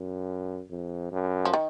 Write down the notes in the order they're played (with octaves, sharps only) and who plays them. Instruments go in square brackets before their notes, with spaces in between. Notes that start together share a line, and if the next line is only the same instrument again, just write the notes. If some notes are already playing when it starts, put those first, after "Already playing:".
Already playing: [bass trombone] F#2
F2
F#2
[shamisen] F3
D#3